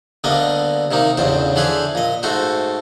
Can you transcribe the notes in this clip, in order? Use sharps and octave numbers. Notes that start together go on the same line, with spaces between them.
D2 D3 G3 A#3 B3 D#5
C3 D#3 A#3 D#4
A1 E2 G2 C#3 C5
D3 E3 G#4 B4 C5
A#2 D#5
G#2 A3 F#4 C5